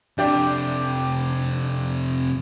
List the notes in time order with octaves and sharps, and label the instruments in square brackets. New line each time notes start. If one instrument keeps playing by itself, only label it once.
[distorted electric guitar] F2 C3 [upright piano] D4 G4 D5